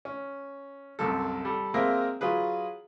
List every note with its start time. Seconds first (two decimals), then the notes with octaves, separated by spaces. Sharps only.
0.05 C#4
0.99 C2 F#2 A4
1.45 G3 A4
1.74 G#3 A#3 C4 A#4 E5
2.21 F#3 F4 G#4 B4